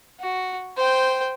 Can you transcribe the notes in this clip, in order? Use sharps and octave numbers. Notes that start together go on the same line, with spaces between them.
F#4
C5 G5